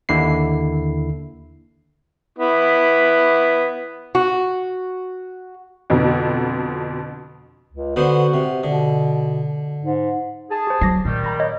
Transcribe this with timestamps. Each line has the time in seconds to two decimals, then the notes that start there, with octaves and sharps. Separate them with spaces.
0.09 D#2 D3 E4 C7
2.39 B3 E4
4.15 F#4
5.90 F2 B2 D3
7.73 C#2
7.96 D3 B3 F#4 C5
8.34 C3
8.64 B2 D3
9.84 G#2
10.51 G#4 A5
10.67 G4 C5
10.81 F#3 D6 A#6 C7
11.05 A#2 D#3 G3
11.24 A#5 B5 A#6
11.40 C#5 D#5